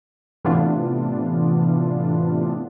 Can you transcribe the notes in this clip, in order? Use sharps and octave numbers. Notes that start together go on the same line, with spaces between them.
A2 C3 E3 B3 D4 F4